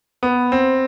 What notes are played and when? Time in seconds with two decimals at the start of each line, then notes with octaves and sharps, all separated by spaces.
0.23 B3
0.52 C4